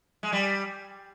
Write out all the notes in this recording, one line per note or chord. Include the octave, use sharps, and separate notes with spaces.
G#3
G3